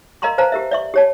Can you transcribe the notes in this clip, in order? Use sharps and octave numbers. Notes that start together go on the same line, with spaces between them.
A#4 D#5 F5 A#5 C6 C#6
B4 C5 F5 A5 A#5
G4 A#4 E5
D5 E5 C#6
G4 C#5 A5